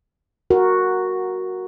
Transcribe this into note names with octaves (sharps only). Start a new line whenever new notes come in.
F#4 A#4